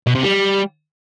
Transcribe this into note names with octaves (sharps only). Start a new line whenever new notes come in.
B2
C3
G3